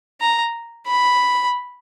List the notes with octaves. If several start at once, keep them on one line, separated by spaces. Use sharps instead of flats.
A#5
B5